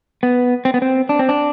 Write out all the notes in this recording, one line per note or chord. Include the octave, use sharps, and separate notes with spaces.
B3
C4
B3
C4
D4
C4
D4